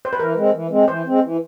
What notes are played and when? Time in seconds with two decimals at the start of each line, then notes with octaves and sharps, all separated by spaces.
0.05 C5
0.13 B4
0.19 E3 A#4
0.37 G#3 C4
0.54 E3
0.71 G#3 C4
0.88 E3 C5
1.06 G#3 C4
1.23 E3